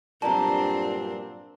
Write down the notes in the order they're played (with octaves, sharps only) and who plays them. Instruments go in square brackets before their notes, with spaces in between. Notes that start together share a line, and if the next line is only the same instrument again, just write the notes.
[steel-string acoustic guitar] G2 F#3 G4 [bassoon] A#2 [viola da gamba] C4 D4 [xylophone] A5 A#5